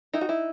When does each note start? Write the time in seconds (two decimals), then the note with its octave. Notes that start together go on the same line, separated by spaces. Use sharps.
0.13 D#4 E4
0.21 F#4
0.29 E4